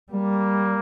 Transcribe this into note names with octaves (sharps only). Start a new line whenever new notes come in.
G3 A#3